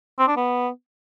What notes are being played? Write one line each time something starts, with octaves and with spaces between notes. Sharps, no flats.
C4
D4
B3